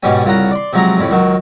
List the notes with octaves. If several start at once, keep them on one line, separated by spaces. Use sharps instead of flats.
G#2 B2 G3 C#4 G#5
C2 C#3 F4 F#5 A#5
D5 C6
C3 F3 F#3 G#3 A#5
F2 A2 C#3
C#2 D#3 F#3